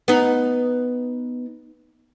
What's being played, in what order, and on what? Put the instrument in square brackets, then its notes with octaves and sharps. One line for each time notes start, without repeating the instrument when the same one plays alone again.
[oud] B3 D#4